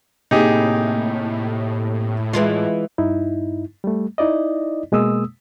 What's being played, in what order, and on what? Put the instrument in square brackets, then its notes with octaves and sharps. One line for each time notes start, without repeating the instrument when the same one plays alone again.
[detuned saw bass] A2 [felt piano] C3 A#3 [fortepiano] D#4 G4 G#4
[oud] E3 G#3 F4
[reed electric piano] G2 D#4 E4
G3 A3
D#4 E4 D5 D#5
B2 G#3 A#3 D#6 E6